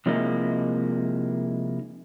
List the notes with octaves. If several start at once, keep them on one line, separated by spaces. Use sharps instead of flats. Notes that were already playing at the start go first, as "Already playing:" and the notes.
C3 F3 G#3 A#3 D#4 E4